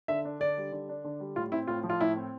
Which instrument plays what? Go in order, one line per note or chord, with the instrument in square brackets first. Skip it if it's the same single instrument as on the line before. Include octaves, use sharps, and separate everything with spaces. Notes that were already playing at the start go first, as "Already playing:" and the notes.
[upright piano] D3 [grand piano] E5
[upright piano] D4
[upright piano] D3 [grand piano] D5
[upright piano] G3
D3
D4
D3
G3
[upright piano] A2 [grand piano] F4
[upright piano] C4 [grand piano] E4
[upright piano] A2 [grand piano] F4
[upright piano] F3
[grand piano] F4
[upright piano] A2 [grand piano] E4
[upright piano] C4